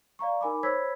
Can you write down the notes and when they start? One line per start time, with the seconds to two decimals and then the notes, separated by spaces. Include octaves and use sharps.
0.19 D5 F5 A#5 C#6
0.41 D#4 A#4 G#5 B5 D6
0.63 C5 C#5 B5 E6 G#6 B6